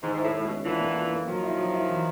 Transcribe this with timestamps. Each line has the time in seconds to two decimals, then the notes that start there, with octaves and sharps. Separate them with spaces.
0.03 G#2 D#3
0.13 G#2
0.18 E4
0.24 A2
0.34 A2 G#3
0.45 B2
0.50 C#4
0.64 D3 E3 F4
0.80 A#3
0.96 F4
1.11 A#3
1.27 D#3 F3 F#3
1.43 E4
1.59 F#3
1.73 E4
1.89 E3